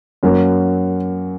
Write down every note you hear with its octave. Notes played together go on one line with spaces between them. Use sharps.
F#2 F#3 A#3